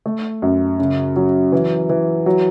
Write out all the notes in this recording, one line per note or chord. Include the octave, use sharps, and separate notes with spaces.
A3
F#2
C#3
F#3
E3
E3
F#3